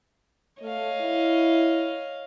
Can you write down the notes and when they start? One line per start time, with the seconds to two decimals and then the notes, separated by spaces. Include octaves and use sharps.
0.61 A3 C#5 D#5 F5
1.00 E4